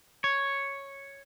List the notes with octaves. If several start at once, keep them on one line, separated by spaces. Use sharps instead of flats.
C#5